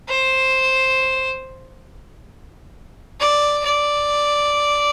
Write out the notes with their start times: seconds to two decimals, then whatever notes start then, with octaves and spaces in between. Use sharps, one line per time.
0.08 C5
3.20 D5
3.65 D5